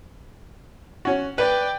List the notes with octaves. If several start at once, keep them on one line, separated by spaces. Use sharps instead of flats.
C#4 F#4
B4 D5 G5